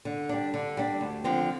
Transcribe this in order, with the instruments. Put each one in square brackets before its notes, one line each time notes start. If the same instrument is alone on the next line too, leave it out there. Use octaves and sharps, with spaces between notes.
[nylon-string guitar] D3
G3 D4
D3
G3 D4
D2
D3 F3 C4